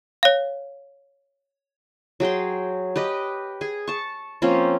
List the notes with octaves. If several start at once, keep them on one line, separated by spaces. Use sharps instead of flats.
C#5 F5
F#3 G#4 G5 C6
G4 B4 D#5
G#4 G#5
A5 C#6
F3 A#3 C4 C#4